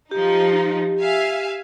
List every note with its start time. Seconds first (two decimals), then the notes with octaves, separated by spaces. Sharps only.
0.11 F3 D#4 G4
1.01 E5 F5 G#5